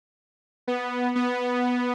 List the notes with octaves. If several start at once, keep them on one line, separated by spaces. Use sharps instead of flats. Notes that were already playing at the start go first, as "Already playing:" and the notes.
B3
B3